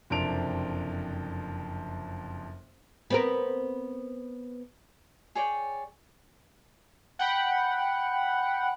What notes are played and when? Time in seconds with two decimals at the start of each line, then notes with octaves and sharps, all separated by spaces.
0.10 F#1 F2 C3 D4 D7 F7
3.10 B3 C4 A#4
5.35 G#4 C#5 D5 G5
7.19 F#5 G5 B5